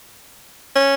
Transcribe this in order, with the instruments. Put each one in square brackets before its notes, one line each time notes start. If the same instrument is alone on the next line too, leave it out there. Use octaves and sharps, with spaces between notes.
[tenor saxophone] C#4